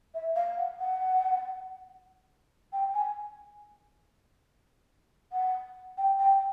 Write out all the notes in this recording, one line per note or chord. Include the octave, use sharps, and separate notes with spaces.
E5
F5
F#5
F#5
G5
G#5
F#5
G5
G5